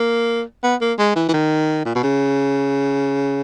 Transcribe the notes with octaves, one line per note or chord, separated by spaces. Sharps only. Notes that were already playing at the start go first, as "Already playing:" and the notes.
Already playing: A#3
B3
A#3
G#3
E3
E3
D#3
A#2
B2
C#3